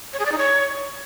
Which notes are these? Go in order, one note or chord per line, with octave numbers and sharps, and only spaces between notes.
C#5
G#4
D5
D#4
C#5